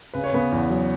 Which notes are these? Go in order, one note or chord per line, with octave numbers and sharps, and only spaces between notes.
C#3 B4
C#5
C#3 B3 B4
E2
F#3